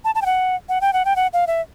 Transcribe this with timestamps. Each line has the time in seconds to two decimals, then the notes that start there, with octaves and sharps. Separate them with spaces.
0.04 A5
0.15 A5
0.22 G5
0.26 F#5
0.69 F#5
0.81 G5
0.93 F#5
1.05 G5
1.16 F#5
1.33 F5
1.47 E5